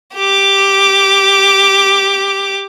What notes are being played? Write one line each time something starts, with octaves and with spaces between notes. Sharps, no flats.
G4 D6